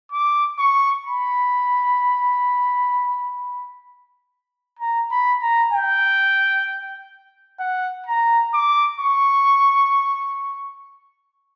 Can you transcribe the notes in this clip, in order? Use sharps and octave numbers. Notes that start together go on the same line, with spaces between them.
D6
C#6
B5
A#5
B5
A#5
G5
F#5
A#5
D6
C#6